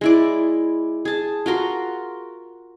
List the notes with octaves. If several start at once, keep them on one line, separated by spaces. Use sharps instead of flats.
G#3 E4 D5
G#4 A5
F4 F#4 A#4 C6